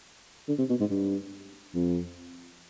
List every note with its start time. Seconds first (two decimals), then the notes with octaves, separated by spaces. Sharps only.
0.48 D3
0.58 C3
0.70 B2
0.80 G#2
0.91 G2
1.74 F2